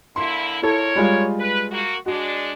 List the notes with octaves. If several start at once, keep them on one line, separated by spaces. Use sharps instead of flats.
D3 A#3 E4 C6
A#2 E4 A4 A#4 C#5
G3 G#3 F4
B4
A#3 F#4
G#3 D4 F#4